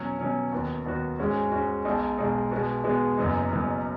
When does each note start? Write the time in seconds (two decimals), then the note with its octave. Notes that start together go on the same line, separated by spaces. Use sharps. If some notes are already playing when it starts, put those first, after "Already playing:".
Already playing: B2 F#3 C#4
0.19 B2 F#3 C#4
0.52 D#2 D#3 B3 F#4
0.85 D#2 D#3 B3 F#4
1.18 G#2 G#3 C#4 F#4
1.51 G#2 G#3 C#4 F#4
1.85 B1 B2 G#3 D#4
2.18 B1 B2 G#3 D#4
2.51 B2 G#3 B3 F#4
2.84 B2 G#3 B3 F#4
3.18 F#1 F#2 F#3 B3 D#4
3.51 F#1 F#2 F#3 B3 D#4